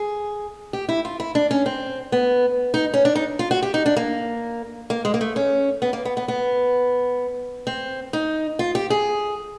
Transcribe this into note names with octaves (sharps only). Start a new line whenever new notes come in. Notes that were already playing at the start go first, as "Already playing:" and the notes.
Already playing: G#4
G4
E4
F4
E4
D4
C#4
C4
B3
D#4
C#4
D4
D#4
F4
F#4
G4
D#4
D4
A#3
A#3
G#3
A#3
A3
C#4
B3
A#3
B3
B3
B3
C4
D#4
F4
G4
G#4